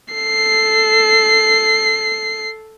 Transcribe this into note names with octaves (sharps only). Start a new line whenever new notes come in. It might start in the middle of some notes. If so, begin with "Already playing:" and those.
A4 C7